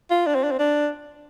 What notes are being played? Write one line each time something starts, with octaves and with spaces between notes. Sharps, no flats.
F4
D4
C4
D4
C4
D4